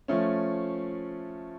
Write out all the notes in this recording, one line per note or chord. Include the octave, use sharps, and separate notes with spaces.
F3 A3 C#4